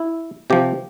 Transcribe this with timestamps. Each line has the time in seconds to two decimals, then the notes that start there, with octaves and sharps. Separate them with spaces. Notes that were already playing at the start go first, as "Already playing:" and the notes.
Already playing: E4
0.50 C3 F3 G4